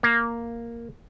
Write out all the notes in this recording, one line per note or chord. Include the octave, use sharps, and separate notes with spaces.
A#3